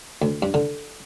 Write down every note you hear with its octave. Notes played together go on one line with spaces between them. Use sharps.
D2
G2
D3